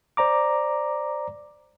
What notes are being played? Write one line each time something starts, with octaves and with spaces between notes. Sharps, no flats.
C5 D5 A#5 D6